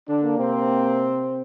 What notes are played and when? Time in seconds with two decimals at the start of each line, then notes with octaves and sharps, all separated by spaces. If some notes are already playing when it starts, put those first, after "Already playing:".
0.08 D3 D4
0.23 A#3
0.38 C3 C4